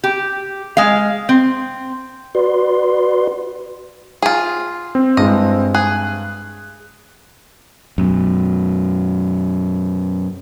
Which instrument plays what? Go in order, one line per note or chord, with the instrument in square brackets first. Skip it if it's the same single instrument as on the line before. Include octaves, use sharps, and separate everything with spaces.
[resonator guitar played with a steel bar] G4
G#3 F5
C4
[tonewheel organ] F#4 B4 D5 C6
[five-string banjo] F4 G#4
[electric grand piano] C4
[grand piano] G2 G#3 E4 [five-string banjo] D#5
[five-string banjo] G#4 [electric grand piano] F#6
[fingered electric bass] F#2 B2